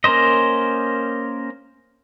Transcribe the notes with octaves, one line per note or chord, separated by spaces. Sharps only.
A#3 C#4 A#4 C5 D#5